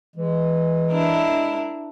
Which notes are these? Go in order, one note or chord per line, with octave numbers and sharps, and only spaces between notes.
E3 G#3
D4 E4 A#4